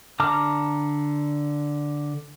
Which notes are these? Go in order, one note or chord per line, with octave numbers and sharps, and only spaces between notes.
D3 A5 A#5 D6 F6